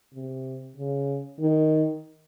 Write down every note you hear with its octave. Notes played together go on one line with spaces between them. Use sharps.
C3
C#3
D#3